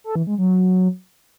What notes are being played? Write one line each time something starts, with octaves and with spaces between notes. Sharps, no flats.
A4
E3
G#3
F#3